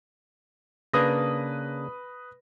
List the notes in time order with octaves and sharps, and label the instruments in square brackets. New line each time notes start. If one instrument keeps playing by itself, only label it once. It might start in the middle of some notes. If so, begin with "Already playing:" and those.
[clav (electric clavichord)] C#3 A#3 D4 [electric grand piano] B4 D#6 A#6